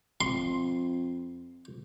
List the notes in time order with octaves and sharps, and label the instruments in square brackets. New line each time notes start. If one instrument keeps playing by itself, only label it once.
[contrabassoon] F2 [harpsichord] C6